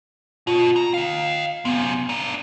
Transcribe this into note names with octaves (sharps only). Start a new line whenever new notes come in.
B2 F4
A#5
D#5 F5
F#2 C3 B3
D4 A#4